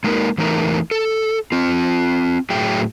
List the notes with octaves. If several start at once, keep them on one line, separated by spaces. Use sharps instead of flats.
G#3 A#3 D#4 A#4
E2 E3 A3 D#4 A#4 A#5
A4
C4 F4
A2 F#3 G#4 E5 G5